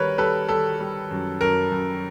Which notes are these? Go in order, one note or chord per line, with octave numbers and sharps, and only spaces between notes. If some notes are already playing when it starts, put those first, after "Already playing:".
Already playing: D#3 G3 A#4 B4 C#5
G3 A4 B4
G3 A4
G3
F#2
F#2 A#4
F#2